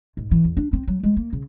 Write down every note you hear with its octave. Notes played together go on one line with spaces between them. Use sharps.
G#2
E3
E2
D4
C4
F#3
G#3
A#3
C#3